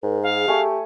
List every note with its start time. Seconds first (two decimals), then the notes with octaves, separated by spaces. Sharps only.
0.03 G#2 A#4
0.23 G#4 F5
0.48 A3 G4 G#5 C#6